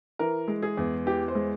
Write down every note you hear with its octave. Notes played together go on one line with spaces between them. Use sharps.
E3 A#4
G#3
G#4
E2
E3 G4
C5
G#3